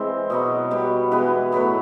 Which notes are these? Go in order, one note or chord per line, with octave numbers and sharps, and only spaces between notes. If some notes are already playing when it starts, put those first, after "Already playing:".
Already playing: E3 G#3 C4
B2 F#3 B3 D#5
B2 G3 B3
E3 G#3 B3 B4
A2 F#3 B3 B4